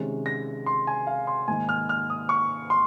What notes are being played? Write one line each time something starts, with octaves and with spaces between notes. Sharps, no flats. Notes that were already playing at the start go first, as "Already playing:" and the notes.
Already playing: C3 D#3 G#3 C#4
A#6
C6
G#5
F5
C6
G#2 D#3 A#3 D#4 G#5
F6
F6
D#6
C#6
C6